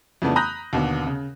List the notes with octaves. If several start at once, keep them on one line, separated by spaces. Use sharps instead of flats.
F2 C#3 E3 A3 B3 D4
A#5 B5 D#6 F#6 G6 A#6
D#2 B2 D3 B3
C#3